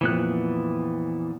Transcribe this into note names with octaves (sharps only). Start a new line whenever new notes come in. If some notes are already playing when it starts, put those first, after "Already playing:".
F2 A#2 E3 F3 B3 F#6